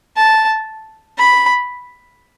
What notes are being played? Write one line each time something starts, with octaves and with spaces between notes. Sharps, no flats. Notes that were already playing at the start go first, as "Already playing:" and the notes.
A5
B5